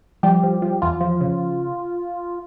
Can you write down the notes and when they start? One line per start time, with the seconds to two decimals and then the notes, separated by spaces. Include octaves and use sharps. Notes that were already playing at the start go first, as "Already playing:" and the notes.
0.23 F3 G3 G4
0.43 F3
0.62 F3
0.82 E2 F4
1.01 F3
1.21 C#3